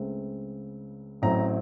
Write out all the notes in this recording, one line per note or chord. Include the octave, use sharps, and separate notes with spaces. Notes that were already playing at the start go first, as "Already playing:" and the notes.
Already playing: C#2 C#3 A3 C4
A1 A2 F#3 C4 A#5